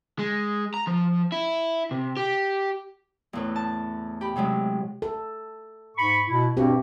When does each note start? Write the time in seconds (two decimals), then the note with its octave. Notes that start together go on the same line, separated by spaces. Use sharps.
0.19 G#3
0.74 A#5
0.87 F3
1.32 E4
1.91 C3
2.17 G4
3.33 E2 A2 B4
3.56 A5
4.21 G4 B5
4.36 A2 C3 F#3 G#3
5.02 A4
5.97 G#2 B5 C#6
6.29 B2 E4
6.57 G2 B2 C4 G4